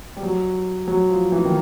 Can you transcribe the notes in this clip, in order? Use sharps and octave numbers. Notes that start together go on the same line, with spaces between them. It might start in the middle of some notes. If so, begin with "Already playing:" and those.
G3
F#3
F#3
F3
E3
D#3